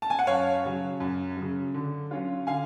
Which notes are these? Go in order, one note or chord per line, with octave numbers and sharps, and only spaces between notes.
A5
G#5
F#5
F#2 C#5 F5
C#3 F#3
F#2
C#3 F#3
D3
F#3 C#4 F4
D3 F5 G#5